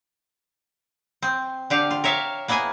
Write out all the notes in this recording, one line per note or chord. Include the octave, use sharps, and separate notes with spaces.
C4
D3 G4 F5
F4
A#4 C#5 E5 F5
A#3 B3 E4 G#4 G#5